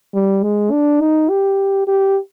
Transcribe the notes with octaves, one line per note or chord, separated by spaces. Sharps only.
G3
G#3
D4
D#4
G4
G4